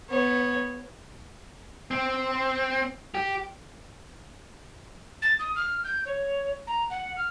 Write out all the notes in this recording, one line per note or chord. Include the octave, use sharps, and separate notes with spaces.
B3 C#5
C4
G4
A6
D#6
F6
G6
C#5
A#5
F#5
F6